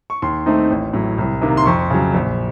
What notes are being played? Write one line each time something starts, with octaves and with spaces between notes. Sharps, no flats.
C#6
D#2 C6
D#3 A3 C4 D#4
A1
A2 F#3
C2
C3 D#3 A#3
C6
F2 C#6
C#3 F#3
A#1